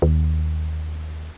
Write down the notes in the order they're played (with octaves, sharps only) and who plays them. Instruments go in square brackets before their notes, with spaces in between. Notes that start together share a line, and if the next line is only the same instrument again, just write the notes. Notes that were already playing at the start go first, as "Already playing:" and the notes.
[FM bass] D#2